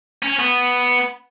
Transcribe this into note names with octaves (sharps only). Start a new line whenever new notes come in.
C#4
B3